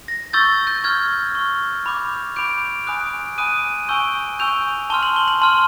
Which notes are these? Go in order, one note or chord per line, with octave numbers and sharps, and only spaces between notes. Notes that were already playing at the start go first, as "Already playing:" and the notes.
A#6
C#6 E6 G6 A6
G6
C#6 F6 G#6
C#6 F6
B5 D6 G6
B5 D6 G6 D7
G#5 B5 D#6 F#6
G#5 B5 D#6 F#6 D#7
G#5 C#6 E6 G6
G#5 C#6 E6 G6 F7
A5 C6 F6 G7
F#7
G7
F#7
A5 C6 F6